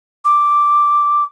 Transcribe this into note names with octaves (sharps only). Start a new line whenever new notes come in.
D6